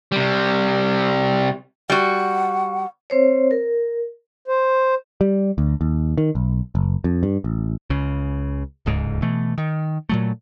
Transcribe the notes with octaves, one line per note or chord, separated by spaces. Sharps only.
C3 G3
G3 F#4 F#5
C4 C5 C#5
A#4
C5
G3
D2
D#2
D#3
B1
F#1
F2
G2
A1
C#2 C#3
D1 C#2 G#2
B2 E3 A3
D#3
A#2 F#3 A3